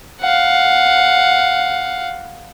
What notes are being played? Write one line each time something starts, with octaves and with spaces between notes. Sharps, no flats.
F5 F#5